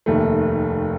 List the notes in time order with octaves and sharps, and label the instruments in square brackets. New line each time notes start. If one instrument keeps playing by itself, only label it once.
[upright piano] F1 D#2 D#3 A3